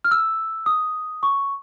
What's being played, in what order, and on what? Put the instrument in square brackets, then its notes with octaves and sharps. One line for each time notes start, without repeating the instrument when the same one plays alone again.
[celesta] F6
E6
D#6
C#6